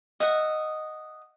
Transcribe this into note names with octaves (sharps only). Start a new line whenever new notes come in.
D#5 E5 F#5